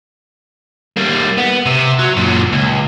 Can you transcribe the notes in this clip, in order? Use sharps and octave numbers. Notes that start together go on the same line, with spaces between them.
G3 A#3
B3
C3
F#3
F#2 A#2
C#2